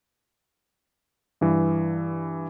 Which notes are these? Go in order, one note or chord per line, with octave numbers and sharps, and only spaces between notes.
G2 E3